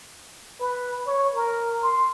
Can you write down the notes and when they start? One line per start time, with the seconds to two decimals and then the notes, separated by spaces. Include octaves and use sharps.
0.60 B4
1.07 C#5
1.35 A#4
1.83 C6